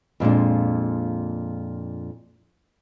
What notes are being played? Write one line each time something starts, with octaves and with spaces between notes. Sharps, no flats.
F2 A#2 G#3 D4